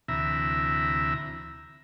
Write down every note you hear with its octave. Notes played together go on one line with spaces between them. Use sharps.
D2 C3 E3 E5 A#5 B5